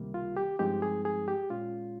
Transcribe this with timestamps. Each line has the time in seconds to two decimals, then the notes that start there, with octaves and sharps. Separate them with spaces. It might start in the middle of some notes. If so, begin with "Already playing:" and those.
Already playing: C#2 C3 D#3 G3 A#3
0.14 F4
0.37 G4
0.59 G2 F3 G#3 C4 D#4 G4
0.82 G#4
1.05 G#4
1.28 G4
1.50 A#2 G#3 C#4 F4